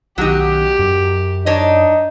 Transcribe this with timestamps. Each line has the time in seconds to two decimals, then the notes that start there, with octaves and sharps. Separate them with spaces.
0.18 B1 D#3 F#3 D#4 G4
0.79 F#2
1.46 D4 D#4 C#5 D#5